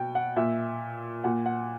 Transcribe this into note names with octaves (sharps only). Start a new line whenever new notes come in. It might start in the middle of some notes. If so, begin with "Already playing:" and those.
Already playing: B2 G5
F#5
A#2 E5
A#2 F#5
F#5